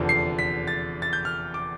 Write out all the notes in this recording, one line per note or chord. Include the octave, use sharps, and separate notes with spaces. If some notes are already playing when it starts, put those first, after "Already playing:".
Already playing: F1 E2 D3 F3
C7
B6
A6
A6
G6
F6
D6